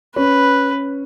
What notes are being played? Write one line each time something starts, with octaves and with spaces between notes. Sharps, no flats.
C#4 B4